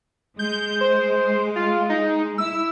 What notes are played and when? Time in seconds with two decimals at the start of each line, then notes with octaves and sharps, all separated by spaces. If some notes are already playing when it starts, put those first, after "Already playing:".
0.39 G#3 G6
0.81 C5
1.56 F4
1.89 D#4
2.38 E4 E6